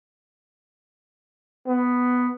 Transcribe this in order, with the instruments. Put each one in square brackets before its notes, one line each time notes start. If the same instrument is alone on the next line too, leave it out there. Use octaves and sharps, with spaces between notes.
[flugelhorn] B3